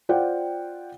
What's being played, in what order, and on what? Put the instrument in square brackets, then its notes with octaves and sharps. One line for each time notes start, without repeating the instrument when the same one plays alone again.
[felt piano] F4 C5 D5 F#5 G5